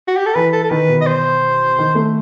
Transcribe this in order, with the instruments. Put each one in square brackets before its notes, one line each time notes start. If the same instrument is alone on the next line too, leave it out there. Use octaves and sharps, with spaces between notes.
[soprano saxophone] F#4
G4
A4
[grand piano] E3 [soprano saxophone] B4
[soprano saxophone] A4
A4
[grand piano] D#3 [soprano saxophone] B4
[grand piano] B2
[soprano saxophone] D#5
C5
[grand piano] D#3
A3